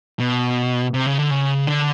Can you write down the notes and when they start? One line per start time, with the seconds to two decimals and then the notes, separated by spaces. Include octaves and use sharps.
0.20 B2
0.94 C3
1.06 C#3
1.18 D3
1.31 C#3
1.67 D3